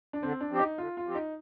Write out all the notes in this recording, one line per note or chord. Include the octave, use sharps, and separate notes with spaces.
D4
D3 C4
D4
F3 C4 G4
D#4
D3 F4
F4
F3 C4 G4
D#4